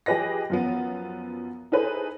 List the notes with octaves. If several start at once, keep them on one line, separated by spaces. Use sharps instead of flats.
F3 G4 G#4 B4 D#5 A#6
F#2 F3 B3
D#4 E4 G#4 A4 B4 C5